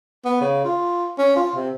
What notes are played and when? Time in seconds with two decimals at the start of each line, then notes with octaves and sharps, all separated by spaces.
0.25 B3
0.41 C#3
0.64 F4
1.18 C#4
1.36 F4
1.55 C3